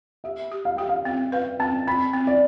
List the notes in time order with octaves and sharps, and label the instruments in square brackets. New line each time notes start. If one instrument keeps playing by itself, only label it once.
[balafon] G4 [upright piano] E5
[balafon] G4
[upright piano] F5
[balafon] G4 [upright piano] G5
[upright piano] F5
[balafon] C4 [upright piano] G5
[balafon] B4 [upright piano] F5
[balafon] C4 [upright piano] A5
[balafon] C4 [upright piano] B5
[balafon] C4
[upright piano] D5